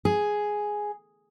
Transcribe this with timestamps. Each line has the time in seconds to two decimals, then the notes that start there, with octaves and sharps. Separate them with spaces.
0.05 G#4